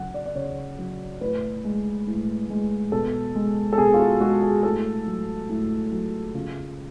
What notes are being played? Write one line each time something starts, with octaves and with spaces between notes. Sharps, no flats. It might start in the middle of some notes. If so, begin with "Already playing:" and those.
Already playing: C#3 F#3 F#5
D5
D5
C#3 C#5
F#3
A2 B4
G#3
A2
G#3
B2 A4
G#3
A4
B2 G#4
F4
F#4
G#3 F#4
G#4
A2 A4
F#3
A2
F#3
C#3 F4